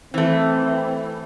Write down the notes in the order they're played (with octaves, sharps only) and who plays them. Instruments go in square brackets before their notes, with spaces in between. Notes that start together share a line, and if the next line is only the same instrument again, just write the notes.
[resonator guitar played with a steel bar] E3 A3 [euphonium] C4